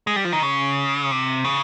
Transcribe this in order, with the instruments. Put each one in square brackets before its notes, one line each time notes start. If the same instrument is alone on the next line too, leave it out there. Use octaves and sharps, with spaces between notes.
[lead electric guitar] G#3
G3
F3
D#3
C#3
C3
C#3